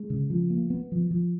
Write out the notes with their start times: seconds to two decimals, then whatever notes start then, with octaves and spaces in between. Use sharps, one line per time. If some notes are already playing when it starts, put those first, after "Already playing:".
Already playing: G#3
0.10 C#3
0.30 F3
0.50 A#3
0.70 B3
0.92 F3
1.11 F3